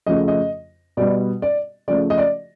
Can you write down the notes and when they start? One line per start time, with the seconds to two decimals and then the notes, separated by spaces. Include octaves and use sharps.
0.07 F2 C#3 F3 A3 D#5
0.28 D#5
0.97 B2 G3 B3 D5
1.42 D5
1.88 C#3 F3 A3 D5
2.10 D#5
2.18 D5